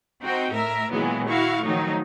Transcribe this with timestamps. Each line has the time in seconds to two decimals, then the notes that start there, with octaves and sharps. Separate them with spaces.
0.23 C4 D#4 F#4 G5
0.53 A2 A#4 E5
0.93 A#2 D#3 E3 F#3 G#3 B3
1.28 E4 F#4 F5 C#6
1.65 D#3 F3 F#3 A3 D#4